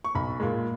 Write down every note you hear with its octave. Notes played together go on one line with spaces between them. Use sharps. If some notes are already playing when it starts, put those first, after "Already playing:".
C#6
B1 B5
A#2 G#3